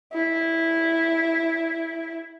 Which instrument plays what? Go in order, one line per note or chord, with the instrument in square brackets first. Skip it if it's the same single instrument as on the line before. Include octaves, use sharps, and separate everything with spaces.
[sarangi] E4